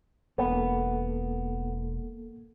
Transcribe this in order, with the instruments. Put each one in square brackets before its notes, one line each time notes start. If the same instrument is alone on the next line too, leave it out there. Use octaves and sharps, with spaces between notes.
[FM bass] E1 [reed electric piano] A#3 A4 [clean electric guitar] B3